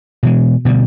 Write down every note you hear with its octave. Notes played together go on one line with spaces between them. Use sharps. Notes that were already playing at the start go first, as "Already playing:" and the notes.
B2 E3 G#3
B2 D3 E3 G3